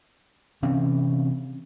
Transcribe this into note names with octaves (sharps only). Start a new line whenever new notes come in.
C3 E3 C4 C#4